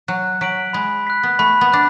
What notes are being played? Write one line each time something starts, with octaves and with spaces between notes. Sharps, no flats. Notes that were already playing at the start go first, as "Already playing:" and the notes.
F#3 F#6
F#3 B6 D7 F#7
G#3 B5
F#6 B6
B3
A3 B5
B3
D4 F#6